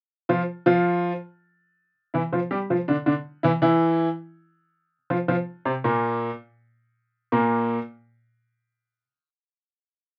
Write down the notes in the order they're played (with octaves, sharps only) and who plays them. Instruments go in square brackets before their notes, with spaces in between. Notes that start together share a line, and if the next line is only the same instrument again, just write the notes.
[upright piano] F3 F4
F3 F4
E3 E4
F3 F4
G3 G4
F3 F4
D3 D4
D3 D4
E3 E4
E3 E4
F3 F4
F3 F4
C3 C4
A#2 A#3
A#2 A#3